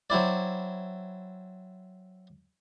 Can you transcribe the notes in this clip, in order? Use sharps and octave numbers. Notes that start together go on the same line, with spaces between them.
F#3 C4 E4 D5